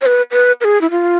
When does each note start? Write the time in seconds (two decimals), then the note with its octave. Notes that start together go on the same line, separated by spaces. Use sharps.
0.01 C#5
0.06 B4
0.31 B4
0.61 B4
0.64 G#4
0.81 E4
0.91 F4